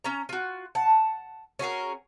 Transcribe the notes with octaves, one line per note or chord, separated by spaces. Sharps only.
C#4 A#5
F4 F#4
F#5 A5
C#4 F#4 G#4 A#4